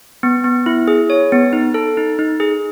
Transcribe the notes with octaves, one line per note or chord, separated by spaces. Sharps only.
B3
B3
E4
G#4
C#5
B3
D#4
A4
D#4
D#4
G#4